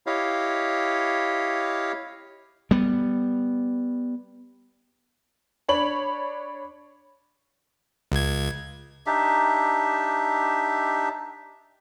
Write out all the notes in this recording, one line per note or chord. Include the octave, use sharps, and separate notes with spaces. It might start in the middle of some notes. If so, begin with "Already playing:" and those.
E4 G4 C#5 D#5 F5
G3 B3
D4 C#5 B5 F#7
C#2 G#6
D4 D#4 G4 E5